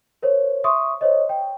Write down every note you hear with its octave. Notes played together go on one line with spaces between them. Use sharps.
A#4 C5 C#5
E5 C6 C#6 D#6
C5 C#5 D#5
G5